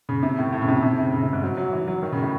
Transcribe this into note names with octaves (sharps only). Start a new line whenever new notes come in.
C#3
C3
A2
A2
C#3
C3
C3
C#3
C#3
C3
G#2
F#3
F#3
E3
F#3
D#3
C#3
A2